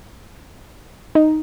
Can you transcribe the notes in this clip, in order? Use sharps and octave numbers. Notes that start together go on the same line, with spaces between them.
D#4